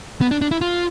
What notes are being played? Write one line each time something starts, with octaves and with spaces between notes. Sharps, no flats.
B3
D4
D4
E4
F4